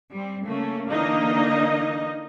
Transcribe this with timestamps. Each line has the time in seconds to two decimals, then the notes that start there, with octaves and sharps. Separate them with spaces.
0.14 G3 C4
0.48 C#3 A3 A#3 C#4
0.91 D3 E3 A#3 D4 D#4 D#5